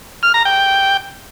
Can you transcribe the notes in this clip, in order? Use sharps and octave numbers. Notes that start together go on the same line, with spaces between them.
F6
A#5
G5